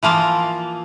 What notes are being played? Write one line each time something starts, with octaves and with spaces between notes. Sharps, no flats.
E3 F3 A#3 F4